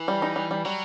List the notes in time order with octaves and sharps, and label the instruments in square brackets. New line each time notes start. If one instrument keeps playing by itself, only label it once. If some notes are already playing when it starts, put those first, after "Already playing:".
Already playing: [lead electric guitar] E3
[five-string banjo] G3
D#4
G3
G3
[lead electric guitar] F#3 [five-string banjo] G3